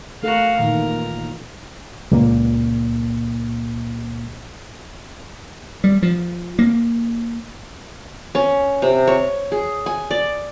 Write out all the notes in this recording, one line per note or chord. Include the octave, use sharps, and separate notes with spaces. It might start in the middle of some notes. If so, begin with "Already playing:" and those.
A3 F#4 A4 A#4 F5
A#2 D#3 E3 A#4
A#3
C#2 A#2 A#3
G3
F3
A#3
C#4
C3
C#5
G#4
G#5
D5